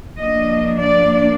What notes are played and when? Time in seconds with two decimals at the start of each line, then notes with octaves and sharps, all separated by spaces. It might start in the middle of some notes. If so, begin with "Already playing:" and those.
0.18 F3 A#3 D4 D#5
0.80 D5